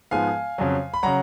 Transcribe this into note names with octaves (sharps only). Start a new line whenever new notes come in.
G#2 F3 G#3 B3 F5 G#5
F2 C#3 F#3
B5
C#3 F#3 F#5 A#5